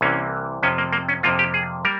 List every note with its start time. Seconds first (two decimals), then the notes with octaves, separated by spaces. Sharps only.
0.01 C2 C3 E3 A#3 C#4
0.63 F2 C3 F3 C#4
0.78 A#3
0.93 A#3
1.09 C#4
1.23 F2 C3 F3 A#3 F4
1.39 G4
1.54 G#4
1.85 G3 A#3 A#4